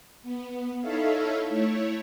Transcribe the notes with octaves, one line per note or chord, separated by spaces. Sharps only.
B3
D#4 E4 A4 C#5 E5 F5
A3 E4 C#5